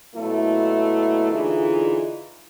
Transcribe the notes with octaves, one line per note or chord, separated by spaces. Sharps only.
B2 F#3 A3 A#3 E4
D3 E3 D#4 F4 G#4